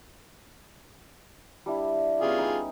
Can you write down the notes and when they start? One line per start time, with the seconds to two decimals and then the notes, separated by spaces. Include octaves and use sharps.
1.66 G3 D4 E4
2.20 B3 C#4 F4 G4 G#4
2.39 G3 D#4